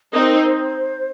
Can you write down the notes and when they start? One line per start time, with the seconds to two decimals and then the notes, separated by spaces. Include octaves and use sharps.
0.12 C4 D#4 A#4
0.33 C5